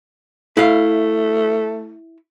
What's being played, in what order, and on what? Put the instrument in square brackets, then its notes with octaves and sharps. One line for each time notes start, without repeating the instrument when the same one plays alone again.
[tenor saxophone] A3 [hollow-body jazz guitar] E4 F5